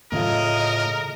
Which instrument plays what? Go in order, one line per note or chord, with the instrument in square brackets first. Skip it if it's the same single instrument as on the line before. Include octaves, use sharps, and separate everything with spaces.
[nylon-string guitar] A2 F4 [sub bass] C#3 [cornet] A#4 [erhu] D#5